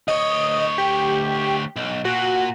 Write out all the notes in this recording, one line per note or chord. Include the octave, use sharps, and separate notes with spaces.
D2 C#5 D#5
G4
B1
A#2 F#4